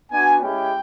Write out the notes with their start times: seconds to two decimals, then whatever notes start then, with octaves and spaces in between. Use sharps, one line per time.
0.11 B3 D4 F#4 G#5
0.42 G#3 C#4 E4 G4 G5